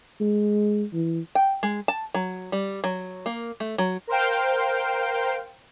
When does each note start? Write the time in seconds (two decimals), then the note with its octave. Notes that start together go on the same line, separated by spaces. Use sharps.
0.20 G#3
0.93 E3
1.35 G5
1.63 G#3
1.88 A5
2.15 F#3
2.52 G3
2.84 F#3
3.26 A#3
3.60 A3
3.78 F#3
4.07 A#4 C5 F5 G5